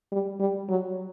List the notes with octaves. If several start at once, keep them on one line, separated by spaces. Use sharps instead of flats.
G3
G3
F#3